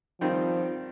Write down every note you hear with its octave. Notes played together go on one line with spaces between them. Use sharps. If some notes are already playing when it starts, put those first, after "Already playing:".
D#3 F3 G3 C4 D#4